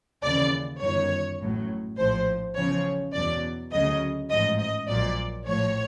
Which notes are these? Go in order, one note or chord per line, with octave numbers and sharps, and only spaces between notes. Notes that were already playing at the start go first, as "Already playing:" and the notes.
D#2 C#3 E3 D5
G1 F#2 D#3 C#5
A1 A2 F#3
A#1 A2 F3 C5
E2 C#3 F3 C#5
E2 B2 F#3 D5
D2 C#3 F#3 D#5
A1 G#2 F3 D#5
D#5
A#1 A#2 F#3 D5
A#1 A2 F3 C#5